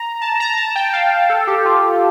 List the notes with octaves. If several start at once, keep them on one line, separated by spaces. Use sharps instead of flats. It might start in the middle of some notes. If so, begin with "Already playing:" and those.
Already playing: A#5
A5
A#5
A5
G5
F5
A4
G4
F4